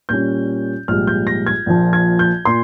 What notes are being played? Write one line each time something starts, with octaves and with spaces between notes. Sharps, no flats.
A#2 G3 C#4 G6
A#1 G#2 G3 F6
G6
A#6
G#6
A#1 A#2 F3
G#6
G6
A#2 C6